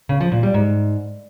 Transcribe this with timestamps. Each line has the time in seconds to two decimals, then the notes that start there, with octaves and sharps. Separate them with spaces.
0.09 C#3
0.21 F3
0.32 A#2
0.43 G3
0.54 G#2